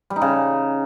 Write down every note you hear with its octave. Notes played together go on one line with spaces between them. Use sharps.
G3
D#4
C#3